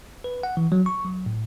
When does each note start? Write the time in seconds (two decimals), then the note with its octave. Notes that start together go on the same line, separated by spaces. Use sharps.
0.24 B4
0.43 F#5
0.57 E3
0.72 F#3
0.86 C#6
1.05 F#3
1.26 A2